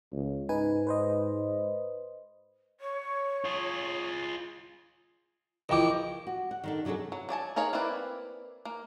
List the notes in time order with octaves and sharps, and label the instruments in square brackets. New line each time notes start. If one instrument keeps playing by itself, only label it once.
[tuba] C#2
[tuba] G#2 [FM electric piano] D#4 B4 G#5
[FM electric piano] B4 C5 D#5
[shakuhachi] C#5
[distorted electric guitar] F4 G#4
[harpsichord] A#1 E3 [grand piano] D#5 G5 D6
[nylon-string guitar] F#4
F#5
D#3 D4 A4
C3 F#3 D4 G#4 A4
[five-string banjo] F#3
F#3 D5 G#5 A5
D#4 G#4 A#4 C#5 F5
A#3 C4 E4 B4 D5
A#3